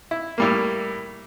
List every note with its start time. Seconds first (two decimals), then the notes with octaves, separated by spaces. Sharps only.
0.11 E4
0.38 A2 G3 A#3